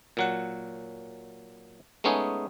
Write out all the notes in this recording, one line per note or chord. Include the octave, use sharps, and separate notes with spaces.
A#2 F#3 F#5
G#3 A3 B3 C#4 D#4 G#4